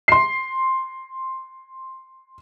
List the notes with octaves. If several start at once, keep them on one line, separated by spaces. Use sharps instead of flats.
C6 C7